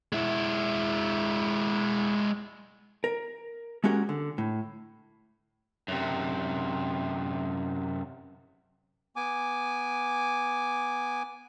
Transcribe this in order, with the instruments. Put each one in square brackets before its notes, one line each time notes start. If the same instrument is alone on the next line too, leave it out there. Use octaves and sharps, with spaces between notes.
[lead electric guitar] G#3 E4
[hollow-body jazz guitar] A#4
G#3 A#3 C#4 F#4 G4 A#4
D3
A2
[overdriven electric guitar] F#2 C3
[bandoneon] B3 G#5 D6